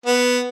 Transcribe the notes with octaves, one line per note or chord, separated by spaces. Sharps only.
B3